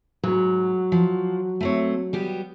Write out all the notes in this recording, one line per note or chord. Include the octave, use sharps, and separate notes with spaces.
G#2 F#3
F3
A3 C4 C#5
G3 B3 G4